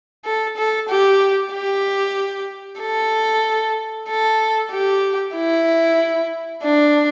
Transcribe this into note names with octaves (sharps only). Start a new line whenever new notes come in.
A4
A4
G4
G4
A4
A4
G4
E4
D4